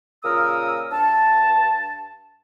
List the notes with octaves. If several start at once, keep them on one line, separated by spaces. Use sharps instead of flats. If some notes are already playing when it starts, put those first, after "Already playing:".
A#2 C#3 A#4 D#6 E6
G2 A5